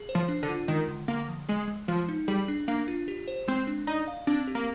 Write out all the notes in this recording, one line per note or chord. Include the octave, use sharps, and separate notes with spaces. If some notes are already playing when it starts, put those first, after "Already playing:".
Already playing: G#4
C5
F3
D4
D3
F4
D#3 G#3
D3
D3 A#3
F3
G#3 G#4
G#3
F3 G#3
D#4
G3 G#4
D4
A#3 D4
F4
G4
C5
G#3 C4
D4
D#4 D5
F5
C4 D4
G4
A#3